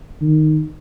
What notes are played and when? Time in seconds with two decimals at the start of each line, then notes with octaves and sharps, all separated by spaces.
0.21 D#3